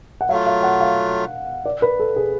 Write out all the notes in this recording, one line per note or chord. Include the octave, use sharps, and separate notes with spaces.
F#5
F#3 A3 F4 F5
F5
F#5
F5
D5
B4
A4
G#4